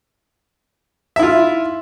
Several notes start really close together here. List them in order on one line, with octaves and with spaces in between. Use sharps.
E5 E4 F4